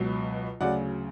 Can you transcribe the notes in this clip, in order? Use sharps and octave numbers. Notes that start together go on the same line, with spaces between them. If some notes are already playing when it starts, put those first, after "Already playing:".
Already playing: C#2 B2 F#3
D2 C#3 F#3 D5 F#5